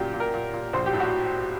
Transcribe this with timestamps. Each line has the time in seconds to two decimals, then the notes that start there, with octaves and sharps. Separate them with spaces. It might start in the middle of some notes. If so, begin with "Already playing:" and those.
Already playing: F#2 A#2 G4
0.14 A#2
0.20 A#4
0.34 A#2
0.53 A#2
0.73 A#1 C5
0.86 G4
0.93 A2
1.00 F#4